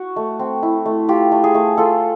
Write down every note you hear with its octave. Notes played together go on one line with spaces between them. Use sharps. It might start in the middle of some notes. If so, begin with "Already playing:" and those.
Already playing: F#4
A3
C4
E4
A3
F4 G4
A3
G#4
A3
F4 A4